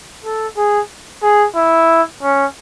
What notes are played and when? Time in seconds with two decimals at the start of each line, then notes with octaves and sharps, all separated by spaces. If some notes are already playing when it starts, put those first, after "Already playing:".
0.24 A4
0.57 G#4
1.23 G#4
1.56 E4
2.22 C#4